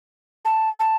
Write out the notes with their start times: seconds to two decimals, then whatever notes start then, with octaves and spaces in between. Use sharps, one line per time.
0.45 A5
0.80 A5